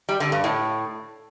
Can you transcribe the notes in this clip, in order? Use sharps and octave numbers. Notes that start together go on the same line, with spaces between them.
G3
D3
G2
A2